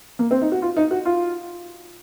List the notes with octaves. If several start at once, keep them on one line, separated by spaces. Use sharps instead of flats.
A#3
C4
D#4
F#4
F4
D#4
F#4
F4